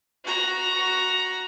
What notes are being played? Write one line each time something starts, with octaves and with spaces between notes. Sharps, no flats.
F#4 A#5